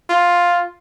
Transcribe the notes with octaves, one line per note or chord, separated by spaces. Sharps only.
F4